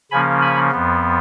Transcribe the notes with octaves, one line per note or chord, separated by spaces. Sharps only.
C#3 F3 A#3 C#4 G#5 B5
G#5 B5
F2 F3 B3